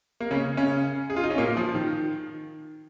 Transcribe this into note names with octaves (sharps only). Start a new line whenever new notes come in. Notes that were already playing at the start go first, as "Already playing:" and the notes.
A#3
C#3 C#4
C#3 C#4
G#4
F4
D#4
C#4
A#2 A#3
F3
D#3